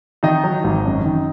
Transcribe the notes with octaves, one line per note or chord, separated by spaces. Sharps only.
D#3 D#4 D#5
F#3
G#1
F#2
D#3